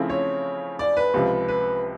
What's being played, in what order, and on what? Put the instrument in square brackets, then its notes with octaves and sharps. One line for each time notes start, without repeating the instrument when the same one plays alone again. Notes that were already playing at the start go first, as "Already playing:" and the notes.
Already playing: [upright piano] C#3 F3 A3 C4 E4
[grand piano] C#5
D5
B4
[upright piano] C#2 C3 F3
[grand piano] B4